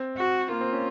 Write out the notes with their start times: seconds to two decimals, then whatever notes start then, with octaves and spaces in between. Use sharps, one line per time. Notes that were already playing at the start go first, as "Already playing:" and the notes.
Already playing: C4
0.17 F#4
0.49 A#3 F4
0.61 C4
0.73 C#4